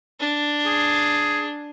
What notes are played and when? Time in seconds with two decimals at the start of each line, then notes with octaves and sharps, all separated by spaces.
0.20 D4
0.66 G#4